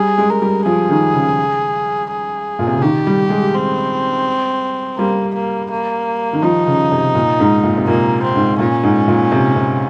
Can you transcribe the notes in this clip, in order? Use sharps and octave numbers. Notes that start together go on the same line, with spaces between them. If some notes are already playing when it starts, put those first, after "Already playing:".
Already playing: G3 G#4
G#3
A#4
G3
F3 G#4
D#3
C#3
G#4
A#2
C3
C#3
D#3 G4
G3
G#3
C4
G3 A#3
A#3
A#3
D#3
F3 D#4
C#3
C3
A#2
G#2
A#2
C3
A#2 A#3
C4
G#2
A#2 C#4
G#2
A#2
C3
C3